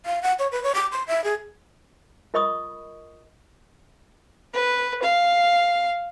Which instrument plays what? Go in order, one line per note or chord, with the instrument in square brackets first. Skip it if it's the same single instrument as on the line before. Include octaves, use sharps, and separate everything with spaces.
[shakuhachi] F5
F#5
C#5
B4
C#5
D6
C6
E5
G#4
[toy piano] F4 A#4 D#5 B5 C#6 D#6
[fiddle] B4
F5